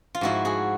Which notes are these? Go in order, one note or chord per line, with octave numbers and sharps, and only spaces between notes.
F4
G#2 F3 E4 F#4
F#4 G#4